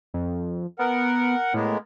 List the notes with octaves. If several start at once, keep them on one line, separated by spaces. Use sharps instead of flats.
F2
B3 A#4 F#5
A2 G#3 A#3 B3